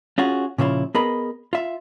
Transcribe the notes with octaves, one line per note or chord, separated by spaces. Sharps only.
C#4 F4 F#4 G#4
A#2 C#3 F3 E4 F4
B3 G#4 A#4 D#5 B5
F4 E5